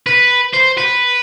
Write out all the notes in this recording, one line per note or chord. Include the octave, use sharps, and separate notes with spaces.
B4
C5
B4